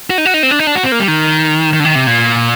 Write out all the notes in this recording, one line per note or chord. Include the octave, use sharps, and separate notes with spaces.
F#4
D#4
F#4
D#4
C4
D4
D#4
D4
F#4
C4
A#3
G3
D#3
D#3
D3
D#3
C3
A#2